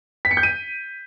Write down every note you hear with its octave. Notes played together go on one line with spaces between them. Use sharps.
B6
C#7
G6
D#7